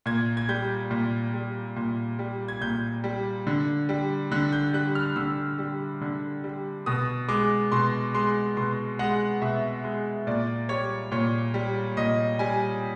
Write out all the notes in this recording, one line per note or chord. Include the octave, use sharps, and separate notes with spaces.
A#2 G#6
G#6
G3 G6
A#2
G3
A#2
G3
G#6
A#2 G6
G3
D3
G3
D3 F#6
G6
G3 F#6
F6
D3 E6
G3
D3
G3
B2 D#6
G#3 D6
B2 C6
G#3 C6
B2 C6
G#3 F#5
B2 E5
G#3
A#2 D5
G3 C#5
A#2 C#5
G3
A#2 D#5
G3 G#5